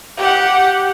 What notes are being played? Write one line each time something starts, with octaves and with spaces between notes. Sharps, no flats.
G4 F#5